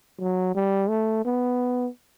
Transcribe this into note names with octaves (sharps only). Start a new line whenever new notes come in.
F#3
G3
A3
B3